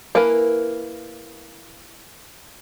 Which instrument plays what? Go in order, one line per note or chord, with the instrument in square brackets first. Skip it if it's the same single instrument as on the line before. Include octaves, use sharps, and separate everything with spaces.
[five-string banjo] A#3 E4 A#4 B4 G#5